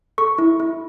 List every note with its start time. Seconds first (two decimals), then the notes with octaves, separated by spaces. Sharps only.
0.18 A4 C#6
0.38 E4
0.60 E4